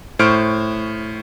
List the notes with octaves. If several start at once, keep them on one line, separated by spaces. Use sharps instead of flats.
A2 C5 C#6 F6 D7